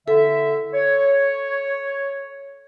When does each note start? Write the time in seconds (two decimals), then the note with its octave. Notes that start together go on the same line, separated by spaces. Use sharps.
0.08 E2 D3 A4 E5
0.74 C#5